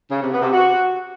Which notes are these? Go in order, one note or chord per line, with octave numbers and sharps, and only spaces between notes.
C#3
C3
B3
C3
F#4